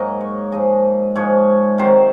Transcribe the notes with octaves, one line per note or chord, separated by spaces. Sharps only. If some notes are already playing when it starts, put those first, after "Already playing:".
Already playing: G#2 F#3 A#3 D#5
C#5
G#2 F3 G#3 D#5
G#2 F3 G#3 C#5
C3 D#3 F#3 C5